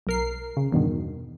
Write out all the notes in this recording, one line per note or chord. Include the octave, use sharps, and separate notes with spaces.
B1 A#4 C7
C#3
E2 G2 B2 D#3